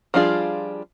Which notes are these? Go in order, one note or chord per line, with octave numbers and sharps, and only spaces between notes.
F3 G3 D4 F4 G#4